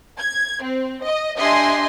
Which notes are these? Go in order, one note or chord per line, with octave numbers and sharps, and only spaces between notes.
G#6
C4
D#5
D4 G4 D#5 E5 G#5 C6